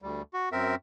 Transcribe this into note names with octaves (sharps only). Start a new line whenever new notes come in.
D2 G3
F#4
F#2 C4 A#4 E5